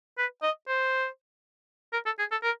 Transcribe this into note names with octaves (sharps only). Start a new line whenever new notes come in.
B4
D#5
C5
A#4
A4
G#4
A4
A#4